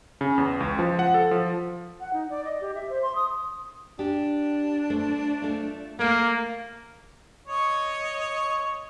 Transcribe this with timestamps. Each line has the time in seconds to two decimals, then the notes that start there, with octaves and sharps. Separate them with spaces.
0.21 C#3
0.38 E2
0.60 C#2
0.79 F3
0.99 F#5
1.14 A4
1.31 F3
2.00 F#5
2.13 D#4
2.30 D5
2.45 D#5
2.61 G4
2.75 E5
2.90 C5
3.03 C6
3.15 D#6
3.99 D4 G4
4.90 A3 C5
5.42 A3 F4
5.99 A3 A#3
7.48 C#5 D#5 C#6